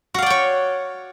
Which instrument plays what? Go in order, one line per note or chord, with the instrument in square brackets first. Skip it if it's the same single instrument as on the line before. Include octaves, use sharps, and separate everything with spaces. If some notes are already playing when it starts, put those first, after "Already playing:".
[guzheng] F#4
F5
D5
G5
C#5